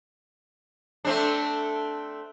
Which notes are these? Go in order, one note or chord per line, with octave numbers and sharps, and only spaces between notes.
A3 C4 D4